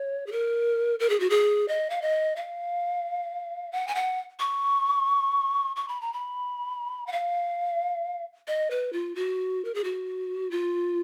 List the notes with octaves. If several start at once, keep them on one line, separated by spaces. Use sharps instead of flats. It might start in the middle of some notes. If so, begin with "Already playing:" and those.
Already playing: C#5
G#4
A#4
A#4
G#4
F#4
G#4
D#5
F5
D#5
F5
F#5
G#5
F#5
C#6
C#6
B5
A#5
B5
F#5
F5
D#5
B4
F4
F#4
A#4
G#4
F#4
F4